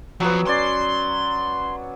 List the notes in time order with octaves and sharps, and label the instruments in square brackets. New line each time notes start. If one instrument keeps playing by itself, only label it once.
[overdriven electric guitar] F2 F3 [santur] F#3 B3
[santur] C#4 D5 [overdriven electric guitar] C6